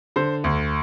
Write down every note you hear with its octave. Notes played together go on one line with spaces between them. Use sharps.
D3 C5
D2